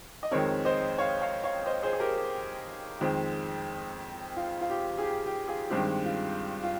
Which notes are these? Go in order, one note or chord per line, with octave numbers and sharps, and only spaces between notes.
D#5
F2 D#3 G#3 C4 A#4 C#5
C5 D#5
C#5 F5
C#5 F5
C#5 F5
C5 D#5
G#4 C5
G#4
G4 A#4
G4
F2 D#3 G#3 C4
F4
F4
G4
G#4
G4
G4
F4 G#4
G2 D#3 G#3 C4 G4
F4
F4